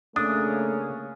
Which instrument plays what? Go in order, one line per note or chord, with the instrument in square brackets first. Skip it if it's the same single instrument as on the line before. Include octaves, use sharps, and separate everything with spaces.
[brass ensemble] C#3 A#3 C#4 [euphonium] A3 [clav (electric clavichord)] D4 [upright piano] D#6